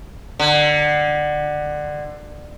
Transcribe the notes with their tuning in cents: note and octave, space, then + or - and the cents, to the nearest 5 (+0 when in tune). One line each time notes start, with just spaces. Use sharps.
D3 +20